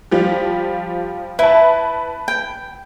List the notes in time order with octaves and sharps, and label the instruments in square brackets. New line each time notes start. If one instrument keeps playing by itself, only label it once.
[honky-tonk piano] F3 G3 G4
[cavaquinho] E4 [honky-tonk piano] B4 A5
[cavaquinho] G5